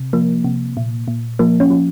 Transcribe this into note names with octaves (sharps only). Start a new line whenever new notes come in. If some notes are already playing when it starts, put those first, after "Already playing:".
Already playing: C3
F3 A#3
C3
A#2
A#2
F3 A#3
C#4
F3